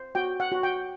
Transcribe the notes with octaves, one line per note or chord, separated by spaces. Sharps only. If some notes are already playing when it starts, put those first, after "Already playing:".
Already playing: C5
F#4 G5
F#5
F#4
G5